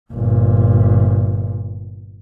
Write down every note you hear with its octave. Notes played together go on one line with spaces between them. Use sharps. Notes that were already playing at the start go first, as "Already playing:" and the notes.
G1 A#2